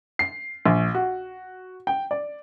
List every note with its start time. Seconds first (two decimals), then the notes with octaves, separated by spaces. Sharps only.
0.19 C7
0.66 A#1
0.95 F#4
1.87 G5
2.11 D5